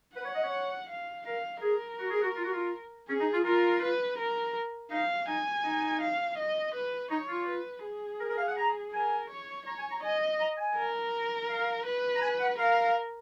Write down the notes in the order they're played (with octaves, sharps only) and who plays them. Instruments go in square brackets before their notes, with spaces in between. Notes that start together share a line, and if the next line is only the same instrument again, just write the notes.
[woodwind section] B4 [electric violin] F#5
[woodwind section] C#5
D#5
C#5
[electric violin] F5
[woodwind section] A#4 [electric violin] F5
[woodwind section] G#4 [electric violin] A#4
[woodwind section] F#4
G#4
F#4
F4
F#4
F4
[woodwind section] C#4 [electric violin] G#4
[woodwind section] D#4
F4
[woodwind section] F4 [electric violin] A#4
[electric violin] B4
A#4
[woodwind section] D#4 [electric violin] F5
[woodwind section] D#4 [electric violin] G#5
[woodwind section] D#4
[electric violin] F5
D#5
B4
[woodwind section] D#4 [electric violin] C#5
[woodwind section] F4
[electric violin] B4
G#4
[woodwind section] A#4
A#4
F5
F#5
A#5
[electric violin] A#4 [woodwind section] G#5
[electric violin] C#5
[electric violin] C#5 [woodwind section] A#5
[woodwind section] G#5
A#5
[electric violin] D#5 [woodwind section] G#5
[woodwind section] A#5
G#5
[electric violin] A#4
[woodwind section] F5
[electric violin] B4
[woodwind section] A#5
G#5
F#5
[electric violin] A#4 [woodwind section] F5